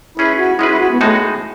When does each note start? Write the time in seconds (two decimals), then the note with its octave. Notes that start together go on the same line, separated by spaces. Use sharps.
0.17 G#3 C#4 E4 G#4 B4
0.38 F#4
0.59 G#3 C#4 E4 G#4 B4
0.69 E4
0.80 F#4
0.91 B3
1.01 A2 G#3 A3 D#4 F#4